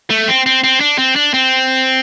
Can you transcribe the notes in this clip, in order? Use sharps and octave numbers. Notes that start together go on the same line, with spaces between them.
A3
C4
C4
C4
D4
C4
D4
C4